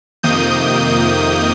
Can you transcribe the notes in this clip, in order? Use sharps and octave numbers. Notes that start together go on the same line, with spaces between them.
F2 C3 D#3 A#3 D#6 G6